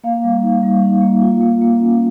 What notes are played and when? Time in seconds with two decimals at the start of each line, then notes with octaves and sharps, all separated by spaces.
0.04 A#3 F5
0.24 G3
0.43 D#4
0.63 G3
0.82 D#4
1.02 A#3
1.22 F4
1.41 A#3
1.61 A#3
1.80 C#4